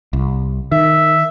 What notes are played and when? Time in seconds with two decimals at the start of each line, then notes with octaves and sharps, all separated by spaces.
0.13 C2
0.72 D#3 E5